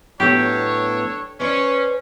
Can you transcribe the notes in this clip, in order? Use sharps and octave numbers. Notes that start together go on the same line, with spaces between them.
A2 F#3 B3 D4 G4 A4 C#5
C#4 B4 C5 D5